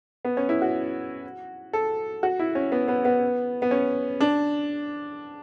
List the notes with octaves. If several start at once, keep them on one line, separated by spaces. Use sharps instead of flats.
B3
C#4
E4
F#4
A4
F#4
E4
C#4
B3
B3
B3
B3
C#4
D4